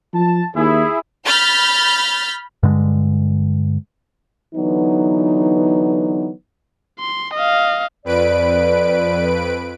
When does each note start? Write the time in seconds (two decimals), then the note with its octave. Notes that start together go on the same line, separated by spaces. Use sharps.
0.14 F3 A5
0.56 D#2 E4 G#4
1.26 B5 F6 G6 A6 B6
2.63 G2 D3 G#3
4.55 D3 E3 F#3 B3 D#4
7.00 C6
7.34 D#5 F5
8.05 F2 B4 D5 D7